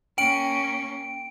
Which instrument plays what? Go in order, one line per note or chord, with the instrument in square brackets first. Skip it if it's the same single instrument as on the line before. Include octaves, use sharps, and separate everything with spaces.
[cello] A#3 C#4 [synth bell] G5 D7